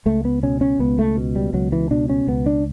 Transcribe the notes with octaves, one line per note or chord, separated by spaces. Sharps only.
C#2 A3
B3
B2 C#4
C#4
C#2 B3
A3
B2
G3
C#2 F#3
E3
B2 D4
C#4
C#2 B3
D4